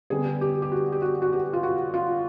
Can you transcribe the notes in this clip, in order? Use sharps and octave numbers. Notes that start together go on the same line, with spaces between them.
D3 G3 B3 G#4
G4
G4
F#4
G4
F#4
F#4
G4
F4
F#4
F4